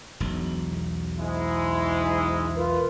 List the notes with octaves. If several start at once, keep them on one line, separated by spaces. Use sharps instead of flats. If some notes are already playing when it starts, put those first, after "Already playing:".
E1 B1
G#2 G#3 E4
F4 A#4 B4